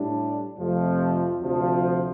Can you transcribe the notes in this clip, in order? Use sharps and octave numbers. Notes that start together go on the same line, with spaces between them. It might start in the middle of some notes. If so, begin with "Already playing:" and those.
Already playing: A2 G3 D4 A4
F2 C3 F3 A3
D2 C3 F3